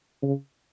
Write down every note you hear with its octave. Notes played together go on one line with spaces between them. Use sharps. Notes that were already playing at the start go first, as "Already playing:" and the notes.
C#3